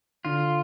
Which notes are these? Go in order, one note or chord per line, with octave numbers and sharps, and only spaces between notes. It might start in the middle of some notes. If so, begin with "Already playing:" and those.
D3 F4